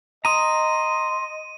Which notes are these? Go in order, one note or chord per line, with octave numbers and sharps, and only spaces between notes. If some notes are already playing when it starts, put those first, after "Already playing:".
D#5 A#5 C6 D#6 D#7